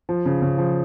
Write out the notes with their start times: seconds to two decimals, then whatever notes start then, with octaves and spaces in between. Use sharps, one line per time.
0.09 F3
0.26 C#3
0.42 C#3
0.58 F3